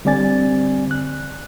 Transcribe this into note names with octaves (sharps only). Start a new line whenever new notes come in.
D3 G3 C4 D5 G#5 A6
F#6